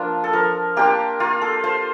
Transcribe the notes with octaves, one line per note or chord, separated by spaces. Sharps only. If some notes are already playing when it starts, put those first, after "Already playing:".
Already playing: F3 A#3 D4 F4
A4
F3 A#4
A#3 D4 F4 G4
A#3 F4
A4
F4 C5